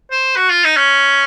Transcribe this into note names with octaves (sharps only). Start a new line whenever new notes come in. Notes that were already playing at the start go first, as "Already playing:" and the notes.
C5
F#4
F4
D#4
C#4